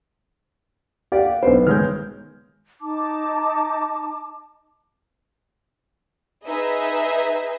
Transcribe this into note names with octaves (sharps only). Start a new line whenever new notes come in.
G4 D5 F5 F#5
B1 B3 C5
D#3 G#3 C#4 F6 G6
D#4 A5 D6
D#4 G#4 B4 D#5 E5